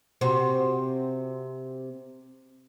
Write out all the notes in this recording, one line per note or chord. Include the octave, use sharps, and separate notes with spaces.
C3 C4 F#4